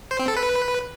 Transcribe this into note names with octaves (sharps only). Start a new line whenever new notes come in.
C5
C4
A4
B4